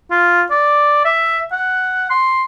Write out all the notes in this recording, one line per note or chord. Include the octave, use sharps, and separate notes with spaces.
F4
D5
E5
F#5
C6